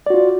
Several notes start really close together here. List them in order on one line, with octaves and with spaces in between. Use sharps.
D5 F#4 F4